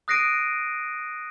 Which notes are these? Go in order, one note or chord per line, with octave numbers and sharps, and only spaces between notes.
D#6 F#6 A#6 C7 D7 D#7